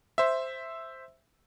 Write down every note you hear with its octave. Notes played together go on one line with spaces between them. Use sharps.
C5 E5